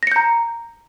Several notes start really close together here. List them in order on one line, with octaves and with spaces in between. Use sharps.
A#6 C#7 G6 A#5